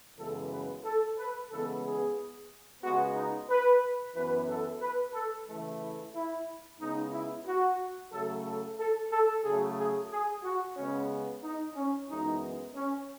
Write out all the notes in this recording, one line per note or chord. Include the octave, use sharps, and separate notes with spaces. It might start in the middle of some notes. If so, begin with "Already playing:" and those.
F#2 C#3 E3 G#3 B3 A4
B4
A4
B4
C#3 E3 G#3 B3 A4
G#4
C#3 G#3 B3 F#4
D#4
B4
F#2 E3 B3 B4
A4
B4
A4
C#3 E3 A3
E4
E4
C#3 G#3 B3 D#4
E4
F#4
C#3 F#3 A3 A4
A4
A4
A4
C#3 F#3 A3 G#4
G#4
G#4
F#4
C#3 G#3 B3 C#4
D#4
C#4
F#2 E3 G#3 B3 D#4
C#4